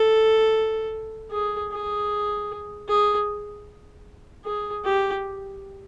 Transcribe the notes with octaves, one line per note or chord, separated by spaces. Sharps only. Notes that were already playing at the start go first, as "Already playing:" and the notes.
Already playing: A4
G#4
G#4
G#4
G#4
G4